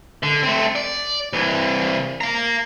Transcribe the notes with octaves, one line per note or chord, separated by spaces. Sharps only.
D3
A3 C4
D5
C2 E3
F5 A#5